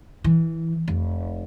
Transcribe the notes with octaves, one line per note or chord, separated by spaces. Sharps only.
E3
F1